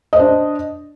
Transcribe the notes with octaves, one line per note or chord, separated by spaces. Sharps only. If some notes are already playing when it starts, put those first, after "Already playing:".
D4 C5 D#5